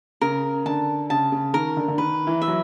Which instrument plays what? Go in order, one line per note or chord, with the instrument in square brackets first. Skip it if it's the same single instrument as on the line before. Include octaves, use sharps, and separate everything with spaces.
[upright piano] C#3 [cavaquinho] A#4
[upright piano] D3 [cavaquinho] A5
[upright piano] C#3 [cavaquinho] A5
[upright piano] C#3
[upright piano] D#3 [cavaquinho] A#4
[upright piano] D3
D3
[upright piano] D#3 [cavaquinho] B4
[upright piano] E3
[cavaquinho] E5
[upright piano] F#3